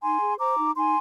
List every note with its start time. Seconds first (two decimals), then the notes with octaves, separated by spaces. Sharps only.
0.02 D#4 G#5 C6
0.21 G#4
0.39 C5 A#5 D6
0.57 D#4
0.75 D#4 G#5 C6